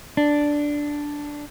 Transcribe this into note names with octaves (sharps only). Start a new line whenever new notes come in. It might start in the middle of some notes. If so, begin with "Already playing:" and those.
D4